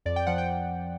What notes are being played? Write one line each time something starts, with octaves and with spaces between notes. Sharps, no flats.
F2 D5
G5
F3 F#5
G5